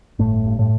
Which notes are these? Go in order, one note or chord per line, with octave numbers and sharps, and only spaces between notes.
G1 A2 A3
G2
A2 A3